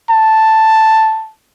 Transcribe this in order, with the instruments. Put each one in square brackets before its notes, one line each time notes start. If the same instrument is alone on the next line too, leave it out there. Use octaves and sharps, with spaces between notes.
[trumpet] A5